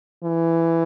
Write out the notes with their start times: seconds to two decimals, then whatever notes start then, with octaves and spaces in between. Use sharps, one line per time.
0.24 E3